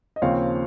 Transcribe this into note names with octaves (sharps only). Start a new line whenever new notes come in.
D#5
D#2 C#3 F3 C4 C#5 F5